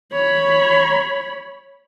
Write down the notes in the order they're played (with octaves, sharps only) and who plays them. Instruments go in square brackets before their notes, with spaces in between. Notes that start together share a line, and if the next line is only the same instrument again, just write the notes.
[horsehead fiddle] C#5 B5